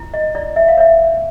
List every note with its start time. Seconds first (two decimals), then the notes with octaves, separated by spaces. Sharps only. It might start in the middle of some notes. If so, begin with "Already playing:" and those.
Already playing: E4
0.14 D#5
0.35 E4 D5
0.56 E5
0.68 F5
0.78 C#5 E5